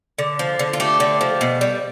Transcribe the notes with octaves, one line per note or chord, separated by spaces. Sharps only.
D3
F3
D3
F4
A3 G4
D3
F3
B2
G3